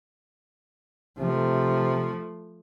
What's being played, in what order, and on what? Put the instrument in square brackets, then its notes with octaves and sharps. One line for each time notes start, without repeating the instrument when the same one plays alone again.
[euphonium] C3 [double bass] F3 A3